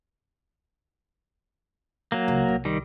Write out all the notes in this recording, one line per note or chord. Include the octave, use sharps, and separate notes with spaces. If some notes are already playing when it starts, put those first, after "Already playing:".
F#3 A#3
C#2
C2
D#3 G3